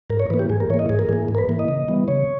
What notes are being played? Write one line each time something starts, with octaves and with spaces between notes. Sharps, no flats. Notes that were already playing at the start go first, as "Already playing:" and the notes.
G#2 A#4
C#5
E3 A#3 B4
G4
G#2 G#4
A#4
E3 A#3 C#5
D#5
G#2 G#4
A#4
E3 A#3 G#4
G#2
A#4
B4
E3 A#3
D#5
C#3
E3 G3 B3
C#3 C#5